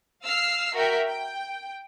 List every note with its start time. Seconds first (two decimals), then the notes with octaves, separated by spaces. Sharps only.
0.23 F5 E6 F6 C7
0.74 F#4 A#4 E5 G5
1.08 G5